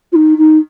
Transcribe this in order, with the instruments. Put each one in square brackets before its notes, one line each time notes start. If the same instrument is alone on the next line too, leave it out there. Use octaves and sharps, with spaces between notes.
[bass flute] F4
D#4
D#4